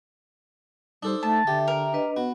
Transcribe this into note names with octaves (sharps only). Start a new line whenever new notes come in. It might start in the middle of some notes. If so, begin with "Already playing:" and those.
G3 D4 D#4 A4 C5
A3 A5
D3 G4 E5
A#4
D4 B4 D#5
B3 F#4 B4